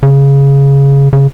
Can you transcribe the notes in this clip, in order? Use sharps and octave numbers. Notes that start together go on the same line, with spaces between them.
C#3
C#3